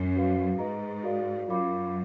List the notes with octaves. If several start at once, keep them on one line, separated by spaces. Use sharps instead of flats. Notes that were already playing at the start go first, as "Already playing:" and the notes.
Already playing: F#2
F#4 B4 F5
G#2 B4 D#5 A#5
F#4 A#4 D5 F5
F#2 F4 A#4 F5 B5 D6